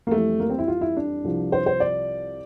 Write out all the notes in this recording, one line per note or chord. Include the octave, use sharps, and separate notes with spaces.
A#3
F2 E3 G3 A3
A#3
C4
E4
F4
E4
D4
C2 C3 F3
C5
C5
D5